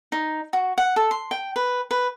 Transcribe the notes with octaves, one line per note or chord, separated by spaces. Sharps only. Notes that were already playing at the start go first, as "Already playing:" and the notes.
D#4
F#4
F#5
A4
C6
G5
B4
B4